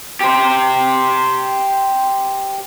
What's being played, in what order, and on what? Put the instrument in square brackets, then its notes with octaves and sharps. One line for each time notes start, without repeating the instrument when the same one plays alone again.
[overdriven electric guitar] G4 C5